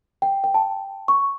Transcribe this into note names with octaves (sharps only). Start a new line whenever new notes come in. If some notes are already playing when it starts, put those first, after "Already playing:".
G5
G5
A5
C#6